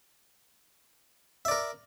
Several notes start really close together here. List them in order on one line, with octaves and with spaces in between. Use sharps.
E5 D5 A#4